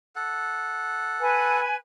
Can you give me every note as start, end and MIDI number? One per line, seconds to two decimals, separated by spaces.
0.16 1.61 69
0.16 1.61 78
1.20 1.76 71
1.20 1.76 80